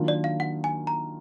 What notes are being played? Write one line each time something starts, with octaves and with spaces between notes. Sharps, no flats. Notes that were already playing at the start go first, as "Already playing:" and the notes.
Already playing: D#3 F#3 A#3 D4 F4
D5
F5
F#5
G#5
A#5